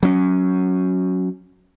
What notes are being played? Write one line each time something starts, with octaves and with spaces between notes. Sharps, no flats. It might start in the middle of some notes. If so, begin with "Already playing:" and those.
F#3 C#4